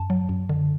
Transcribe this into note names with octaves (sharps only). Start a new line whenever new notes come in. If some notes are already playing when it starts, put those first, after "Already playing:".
Already playing: F#2 A5
F#3
F#2
D3